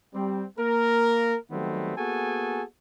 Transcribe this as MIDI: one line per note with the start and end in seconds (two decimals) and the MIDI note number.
0.14 0.44 55
0.14 0.44 60
0.58 1.35 58
0.58 1.35 70
1.51 1.95 51
1.51 1.95 54
1.51 1.95 55
1.51 1.95 57
1.51 1.95 59
1.51 1.95 60
1.97 2.63 58
1.97 2.63 59
1.97 2.63 66
1.97 2.63 68
1.97 2.63 69
1.97 2.63 80